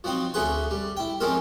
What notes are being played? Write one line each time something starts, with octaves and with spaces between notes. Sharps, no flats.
F3 F#3 C4 D#4
D2 A3 C#4 G#4 B4 C6
G3
E4 G5
F3 G#3 C4 C#4 A4 A#4